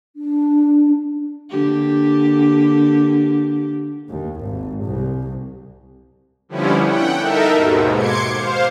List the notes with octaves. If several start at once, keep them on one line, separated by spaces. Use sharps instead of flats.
D4
D3 A#3 G4
D#2
G#1
C2
D3 F3 G3 B3 C#4 E4
F#5 G5
D#4 A4 A#4 E5
D#2 G#2 B2
C6 D6 G#6 C#7
C5 F5